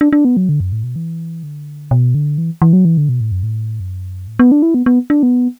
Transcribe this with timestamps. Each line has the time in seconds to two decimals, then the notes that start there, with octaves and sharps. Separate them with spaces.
0.01 D4
0.13 D4
0.25 B3
0.37 F#3
0.49 D3
0.60 F#2
0.72 A2
0.84 B2
0.96 E3
1.43 D3
1.91 B2
2.15 D3
2.38 E3
2.62 E3
2.73 F#3
2.85 E3
2.98 D3
3.09 B2
3.21 A2
3.32 F#2
3.43 A2
3.80 F#2
4.27 A2
4.39 B3
4.52 D4
4.62 E4
4.74 B3
4.86 B3
5.10 D4
5.23 B3